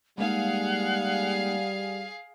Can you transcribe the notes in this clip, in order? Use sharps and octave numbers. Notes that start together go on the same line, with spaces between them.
G3 G#3 A#3 D#4 G#4 F5 F#5